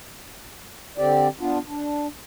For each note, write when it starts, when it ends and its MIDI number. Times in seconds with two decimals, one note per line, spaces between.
0.98 1.28 50
0.98 1.28 60
0.98 1.28 67
0.98 1.28 74
1.40 1.58 59
1.40 1.58 62
1.40 1.58 65
1.67 2.07 62